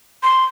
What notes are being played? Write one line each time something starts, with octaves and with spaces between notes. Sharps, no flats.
C6